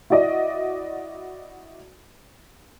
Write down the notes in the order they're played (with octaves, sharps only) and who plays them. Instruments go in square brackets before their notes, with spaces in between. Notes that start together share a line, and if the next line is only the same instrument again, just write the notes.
[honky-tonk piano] E4 F#4 D5 D#5